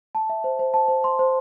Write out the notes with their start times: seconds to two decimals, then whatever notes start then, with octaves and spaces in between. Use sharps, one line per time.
0.15 A5
0.29 E5
0.44 C5
0.59 C5
0.74 A5
0.88 C5
1.04 C6
1.19 C5